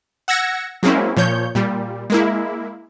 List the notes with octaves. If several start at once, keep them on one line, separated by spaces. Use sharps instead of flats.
F#5 E6 G#6 A#6 C#7
F#3 G#3 A#3 C4 C#4 E4
A#2 F3 C#5 G6
A#2 G3
G#3 A#3 E4